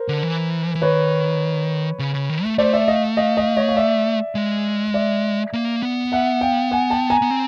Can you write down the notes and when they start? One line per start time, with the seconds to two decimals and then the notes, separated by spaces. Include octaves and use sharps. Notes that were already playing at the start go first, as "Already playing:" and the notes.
Already playing: A#4 C5
0.08 D3
0.23 E3
0.75 E3
0.82 D#3 B4 C#5
1.99 C#3
2.14 C#3
2.29 D#3
2.44 A3
2.58 A3 C5 D5
2.73 D5 E5
2.88 D#5 F5
3.17 D#5 F5
3.37 D#5 F5
3.57 C#5 D#5
3.68 F5
3.77 D5 E5
4.35 G#3
4.94 D5 E5
5.53 A#3
5.82 B3
6.12 E5 F#5
6.41 F5 G5
6.71 F#5 G#5
6.90 G5 A5
7.10 G#5 A#5
7.22 B3
7.30 C4